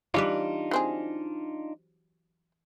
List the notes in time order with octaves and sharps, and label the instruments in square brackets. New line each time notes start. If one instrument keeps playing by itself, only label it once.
[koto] E3 G3 B4 [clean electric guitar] D4 D#4 F4
[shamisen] F#3 C4 G#4